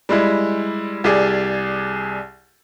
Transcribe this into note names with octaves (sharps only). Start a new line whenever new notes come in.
G3 G#3 E4
C2 G4 G#4 D5